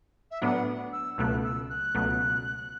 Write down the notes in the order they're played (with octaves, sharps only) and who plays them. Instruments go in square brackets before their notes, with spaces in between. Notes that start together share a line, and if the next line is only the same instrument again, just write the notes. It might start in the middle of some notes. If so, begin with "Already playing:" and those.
[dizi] E5
[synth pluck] A2 F#3 B3 D4 [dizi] F#5
[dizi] E6
[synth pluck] C#2 B2 F#3 A3 [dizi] F#6
[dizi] E6
F#6
[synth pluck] C#2 B2 F#3 A3